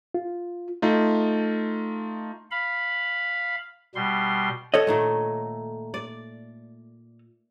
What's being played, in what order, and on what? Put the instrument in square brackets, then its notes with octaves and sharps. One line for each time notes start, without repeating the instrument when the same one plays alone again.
[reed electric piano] F4
[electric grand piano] A3 D#4 F4
[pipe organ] F5 B5
B2 G3 C6
[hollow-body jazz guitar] A4 C#5 D#5
[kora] A#2 D#3 A3
D5